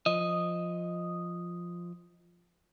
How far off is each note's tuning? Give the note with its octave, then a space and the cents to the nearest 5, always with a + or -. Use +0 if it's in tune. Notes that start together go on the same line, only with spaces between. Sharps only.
F3 +0 D#5 +0